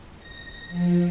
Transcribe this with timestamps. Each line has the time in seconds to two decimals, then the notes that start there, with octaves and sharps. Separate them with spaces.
0.18 A#6
0.69 F3